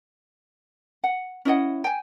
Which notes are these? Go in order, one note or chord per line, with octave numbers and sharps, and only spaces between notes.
F#5
C#4 E4 D#5 F#5
G5 G#5